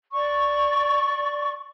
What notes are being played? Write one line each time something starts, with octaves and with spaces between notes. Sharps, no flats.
D5 C#6